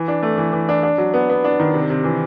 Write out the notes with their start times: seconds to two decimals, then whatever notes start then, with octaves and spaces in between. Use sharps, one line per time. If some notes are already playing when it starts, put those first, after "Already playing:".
Already playing: E3
0.08 D4
0.23 A3
0.38 E3
0.53 E3
0.69 D4
0.83 D4
0.98 F#3
1.14 B3
1.30 B3
1.44 D4
1.60 D#3
1.74 C3
1.90 C3
2.04 E3